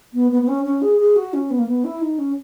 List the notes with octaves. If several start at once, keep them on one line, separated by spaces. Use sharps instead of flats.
B3
B3
B3
C#4
C#4
G#4
G#4
F#4
C#4
B3
A#3
B3
E4
D#4
C#4